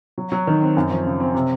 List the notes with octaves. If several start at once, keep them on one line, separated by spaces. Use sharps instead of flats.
F#3
F#3
D#3
C4
F#2
F3
C#3
C4
C3